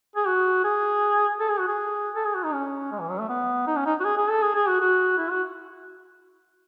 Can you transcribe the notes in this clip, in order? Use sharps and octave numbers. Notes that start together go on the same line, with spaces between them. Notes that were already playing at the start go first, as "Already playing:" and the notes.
G#4
F#4
G#4
A4
G#4
F#4
G#4
A4
G#4
F#4
D#4
C#4
G#3
E3
F#3
A3
B3
D#4
C#4
D#4
F#4
G#4
G#4
A4
G#4
G#4
F#4
F#4
E4
F#4